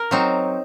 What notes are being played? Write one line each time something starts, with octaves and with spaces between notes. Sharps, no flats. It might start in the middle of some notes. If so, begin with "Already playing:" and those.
Already playing: A#4
F#3 C4 D#4